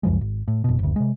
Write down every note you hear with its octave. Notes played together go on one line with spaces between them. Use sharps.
C#2 F#2 F3 G#3
G#1
A2
F#1 B2
F#1 D2
C3 G#3